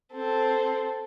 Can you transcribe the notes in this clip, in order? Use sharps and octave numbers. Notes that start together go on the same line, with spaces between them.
C4 A4